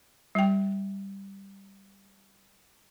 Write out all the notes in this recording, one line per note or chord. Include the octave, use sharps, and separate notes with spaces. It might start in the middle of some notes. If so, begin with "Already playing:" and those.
G3 G5